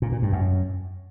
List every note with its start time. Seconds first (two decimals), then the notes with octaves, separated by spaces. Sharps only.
0.02 A#2
0.12 A#2
0.22 G2
0.32 F#2